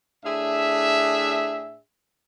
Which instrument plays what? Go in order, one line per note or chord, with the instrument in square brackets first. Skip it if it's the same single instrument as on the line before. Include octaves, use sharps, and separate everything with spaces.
[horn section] A2 D4 G#4 E5